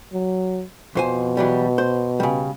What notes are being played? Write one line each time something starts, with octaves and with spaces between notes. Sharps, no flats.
F#3
F2 B2 C5 G#5
E3 F#3 G3
C5
C#3 G3